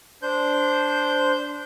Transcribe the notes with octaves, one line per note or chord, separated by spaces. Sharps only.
D4 C5 G6